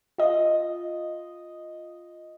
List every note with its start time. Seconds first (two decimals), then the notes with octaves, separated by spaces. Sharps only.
0.18 F4 D#5